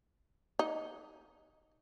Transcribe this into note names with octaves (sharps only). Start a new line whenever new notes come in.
D#4